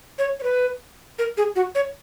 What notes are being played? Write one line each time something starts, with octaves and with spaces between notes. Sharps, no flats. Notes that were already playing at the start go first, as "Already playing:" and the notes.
C#5
C#5
B4
A#4
G#4
F#4
C#5